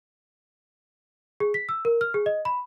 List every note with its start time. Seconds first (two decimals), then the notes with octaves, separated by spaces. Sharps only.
1.40 G#4
1.54 B6
1.69 E6
1.85 A#4
2.01 F6
2.14 G#4
2.26 D#5
2.45 B5